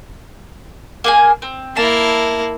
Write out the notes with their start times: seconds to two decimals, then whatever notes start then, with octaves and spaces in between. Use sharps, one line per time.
1.04 A#3 G#4 G#5
1.42 C4
1.77 A#3 E4 A5